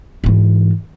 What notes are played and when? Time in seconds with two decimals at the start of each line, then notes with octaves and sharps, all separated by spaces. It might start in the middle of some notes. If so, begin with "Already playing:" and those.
0.24 G#2 E3